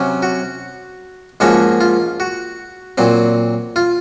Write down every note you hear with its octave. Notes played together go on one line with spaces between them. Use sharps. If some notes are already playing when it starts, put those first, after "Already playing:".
Already playing: C3 F#3 C#4
F#4
G#2 F3 A#3 C#4 F#4
F4
F#4
A#2 F#3 C4
F4